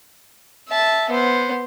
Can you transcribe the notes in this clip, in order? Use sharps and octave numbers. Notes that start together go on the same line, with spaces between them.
E5 A5
B3 C5